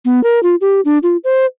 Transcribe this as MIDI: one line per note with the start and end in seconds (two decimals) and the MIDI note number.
0.05 0.23 59
0.24 0.42 70
0.43 0.55 65
0.61 0.81 67
0.85 0.98 62
1.03 1.17 65
1.24 1.46 72